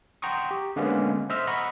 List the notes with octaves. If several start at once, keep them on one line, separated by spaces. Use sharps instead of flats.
F#5 G5 A#5 C6 C#6 D#6
G4
D3 G#3 A#3 B3 C#4
C5 D#5 E5 C6 E6 F6
D#5 F#5 A#5 B5 C#6